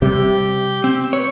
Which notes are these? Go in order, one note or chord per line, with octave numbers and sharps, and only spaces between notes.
C3 G3 G4
C4
B4 C#5